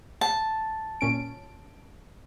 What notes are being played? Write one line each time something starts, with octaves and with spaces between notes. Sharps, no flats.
A5
A#2 C#4 D7